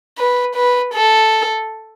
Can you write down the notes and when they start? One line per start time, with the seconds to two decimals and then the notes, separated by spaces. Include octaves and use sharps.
0.18 B4
0.55 B4
0.94 A4